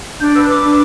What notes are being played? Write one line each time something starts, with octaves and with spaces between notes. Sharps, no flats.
D4 G6
B4 E6
B4 D6
D4